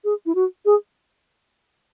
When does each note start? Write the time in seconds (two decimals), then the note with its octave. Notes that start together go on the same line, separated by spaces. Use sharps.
0.04 G#4
0.26 E4
0.35 F#4
0.65 G#4